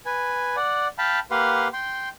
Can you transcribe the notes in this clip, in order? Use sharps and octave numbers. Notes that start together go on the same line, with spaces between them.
B4 G#5
D5 F#5
F5 G5 A5 B5
A#3 G4 B4 F5 F#5 C6
G5 C6